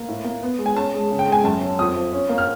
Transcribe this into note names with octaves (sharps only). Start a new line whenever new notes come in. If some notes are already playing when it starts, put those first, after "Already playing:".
Already playing: A#3
A2
A#3
B3
G#3
G#5
C#4 A5
G#3
C#3
G5
G#3
G#5
F#2 A5
F#3
F2 D#6
F3
C#4
A#3
F6